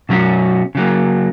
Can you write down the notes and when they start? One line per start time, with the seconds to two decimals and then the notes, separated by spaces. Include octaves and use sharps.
0.09 B2 F#3 C#4 F#4
0.75 C#3 F#3 A#3